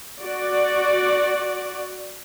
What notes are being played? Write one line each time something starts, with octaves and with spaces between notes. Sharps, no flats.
F#4 D5